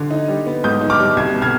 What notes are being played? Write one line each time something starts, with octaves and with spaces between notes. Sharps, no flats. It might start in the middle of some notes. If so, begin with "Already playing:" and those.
Already playing: D3 G#6
D#4
G3
B3
G#2 D#6 G6
D#4
D6 F6
G3
C2 G#6
B2
F6 G#6